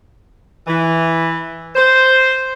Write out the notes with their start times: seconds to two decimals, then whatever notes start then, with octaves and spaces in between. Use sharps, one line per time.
0.67 E3
1.76 C5